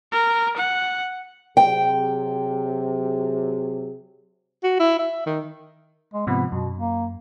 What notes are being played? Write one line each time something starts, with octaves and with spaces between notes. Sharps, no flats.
A#4
F#5
C3 F#3 G#4 G5
F#4
E4
E5
D#3
G#3
G#2 C3 F3 B3
F#2 B2
A#3